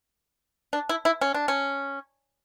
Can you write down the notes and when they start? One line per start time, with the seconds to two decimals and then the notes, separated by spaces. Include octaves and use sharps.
0.73 D4
0.89 E4
1.05 E4
1.21 C#4
1.34 D4
1.48 C#4